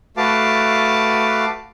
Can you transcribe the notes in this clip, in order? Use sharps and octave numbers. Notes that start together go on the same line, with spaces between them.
A3 F#4 B4 F5 A5 D6